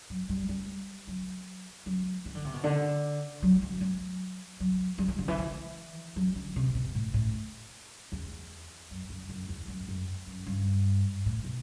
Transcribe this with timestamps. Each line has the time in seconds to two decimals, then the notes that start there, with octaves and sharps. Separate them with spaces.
0.10 F#3
0.29 G3
0.49 G3
1.07 F#3
1.86 F#3
2.25 E3
2.35 D3
2.45 C3
2.54 B2
2.64 D3
3.42 F#3
3.62 E3
3.81 F#3
4.60 F#3
4.98 G3
5.08 E3
5.19 D3
5.28 E3
5.38 E3
6.16 F#3
6.36 D3
6.56 C3
6.75 B2
6.95 A2
7.14 A2
8.12 E2
8.91 F#2
9.10 F#2
9.29 F#2
9.49 E2
9.68 F#2
9.88 F#2
10.27 F#2
10.46 G2
11.26 A2
11.44 B2